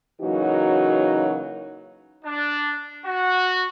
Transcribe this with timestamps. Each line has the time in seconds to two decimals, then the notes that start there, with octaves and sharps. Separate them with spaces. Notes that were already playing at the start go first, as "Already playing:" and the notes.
0.22 C#3 E3 F#3 A#3 D#4 F#4
2.24 D4
3.05 F#4